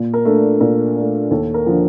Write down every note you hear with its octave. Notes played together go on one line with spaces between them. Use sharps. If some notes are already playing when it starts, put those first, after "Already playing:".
Already playing: A#2
A#4
A3 D4
A#2 A#4
A3 D4
D#2 A4
A#4
D3 F3